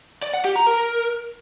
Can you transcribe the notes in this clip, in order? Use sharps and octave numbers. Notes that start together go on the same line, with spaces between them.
D5
F#5
G4
A#5
A#4